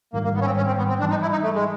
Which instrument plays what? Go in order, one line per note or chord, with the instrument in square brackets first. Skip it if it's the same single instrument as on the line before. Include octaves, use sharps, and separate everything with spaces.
[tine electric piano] G#1 G#2 D#3 G3 [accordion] A#3
[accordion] A#3
B3
C#4
C4
C#4
C4
B3
C4
[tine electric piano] A2 E3 G3 [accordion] D4
[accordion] D#4
E4
D#4
A3
G#3